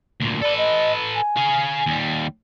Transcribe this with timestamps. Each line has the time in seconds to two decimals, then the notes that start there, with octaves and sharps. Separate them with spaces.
0.20 D2 A#2
0.41 A4 B4 D5
0.58 D#5
1.15 G#5
1.36 G#4 F5
1.87 D#2 G3